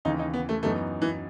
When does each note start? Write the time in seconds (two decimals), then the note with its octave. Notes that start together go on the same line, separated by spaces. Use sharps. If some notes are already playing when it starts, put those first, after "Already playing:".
0.05 D#2 C#3 E3 D#4
0.19 D#4
0.34 B3
0.49 A3
0.63 F#2 E3 A3 B3 D#4
1.02 E3